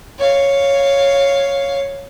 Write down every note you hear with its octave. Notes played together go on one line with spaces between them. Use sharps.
C#5 F5